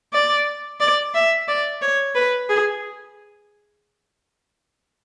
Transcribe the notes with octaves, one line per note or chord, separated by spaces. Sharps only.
D5
D5
E5
D5
C#5
B4
G#4